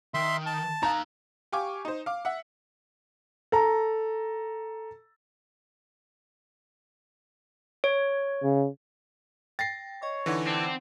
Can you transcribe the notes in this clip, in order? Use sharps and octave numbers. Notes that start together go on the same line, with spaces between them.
D#3 E5 C6
A5
D#4 F5 A#5
G4 F5 G#5 C#6 D6
D#4 C5
F5 D6
E5 F#5
A4 A#5
C#5
C#3
G5 A6 A#6 C7
C#5 D#5 C#6
D3 E3 D#4 F#5
C4 D4